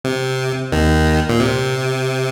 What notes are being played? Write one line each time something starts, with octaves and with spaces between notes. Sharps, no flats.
C3
D#2 D#3
A#2
C3